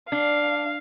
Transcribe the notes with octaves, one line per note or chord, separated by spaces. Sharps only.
D4 F5